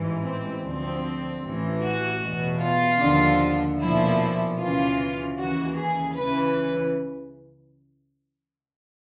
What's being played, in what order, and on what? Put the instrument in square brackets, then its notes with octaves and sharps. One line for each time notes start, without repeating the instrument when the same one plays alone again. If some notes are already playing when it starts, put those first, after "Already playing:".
Already playing: [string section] A1 G#2 E3
C4
D2 D3 F3 C4
A1 A2 E3
F#4
E2 B2
F4
D#2 D3 F3
B1 A#2 F3 E4
D2 C#3 E3 F4
D#2 C#3 E3 F#4
G#4
C#2 C#3 E3 B4